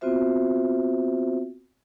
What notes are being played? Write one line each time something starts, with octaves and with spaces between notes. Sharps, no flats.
B3 C4 F4 F#4 C5 E5